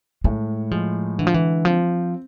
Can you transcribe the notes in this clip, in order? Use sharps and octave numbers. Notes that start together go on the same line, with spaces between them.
A2 G#3
F3 G#3
D3 E3
F3
E3
F3 C4